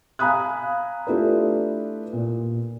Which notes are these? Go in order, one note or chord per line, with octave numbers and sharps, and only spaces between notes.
F5 G#5 A#5 B5 D#6 F#6
A3 D4 E4 F4 G4 B4
A#2